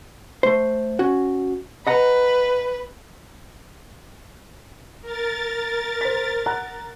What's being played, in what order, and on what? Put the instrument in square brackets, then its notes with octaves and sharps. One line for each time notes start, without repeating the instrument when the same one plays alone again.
[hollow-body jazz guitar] A3 C5
C#4 F#4
[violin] B4 [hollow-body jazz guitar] D#5 F#5 A#5
[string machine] A#4 A6
[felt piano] C5 B6
F#5 A#5 F#6